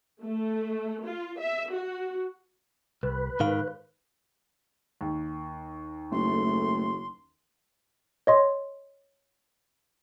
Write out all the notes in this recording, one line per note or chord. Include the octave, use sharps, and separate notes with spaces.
A3
F4
E5
F#4
C2 B4
G#2 D#3 F5
D#2
F#1 A3 C6
C#5 D#5 C6